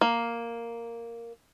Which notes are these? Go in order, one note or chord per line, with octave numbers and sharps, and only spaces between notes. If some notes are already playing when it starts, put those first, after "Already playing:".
A#3